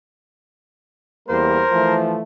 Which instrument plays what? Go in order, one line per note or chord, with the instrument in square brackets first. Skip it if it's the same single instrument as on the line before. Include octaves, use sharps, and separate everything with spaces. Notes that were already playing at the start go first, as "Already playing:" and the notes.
[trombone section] E2 G3 A#3 [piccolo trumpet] A#4 [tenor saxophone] C5
[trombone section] E3 F3 A3